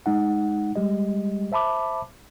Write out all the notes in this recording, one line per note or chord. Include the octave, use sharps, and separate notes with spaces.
G#3 D#4 F#5
G3 G#3 G4 D#5
C5 E5 A5 B5 D6